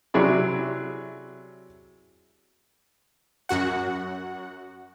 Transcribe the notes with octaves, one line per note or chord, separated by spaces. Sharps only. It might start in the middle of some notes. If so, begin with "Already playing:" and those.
C3 F#3 E4 G#4 D5
F#2 F#4 F#5